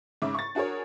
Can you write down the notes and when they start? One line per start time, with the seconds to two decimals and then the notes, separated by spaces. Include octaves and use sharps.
0.22 G#2 C#3 E5 D6
0.34 C#6 A6
0.55 D4 F#4 G#4 A#4 C#5